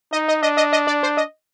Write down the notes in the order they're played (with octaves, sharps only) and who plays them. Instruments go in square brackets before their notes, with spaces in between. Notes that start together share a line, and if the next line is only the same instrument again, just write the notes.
[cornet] D#4 [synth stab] D#5
[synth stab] D#5
[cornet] D4 [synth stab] D#5
[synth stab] D#5
D#5
D5
C5
D#5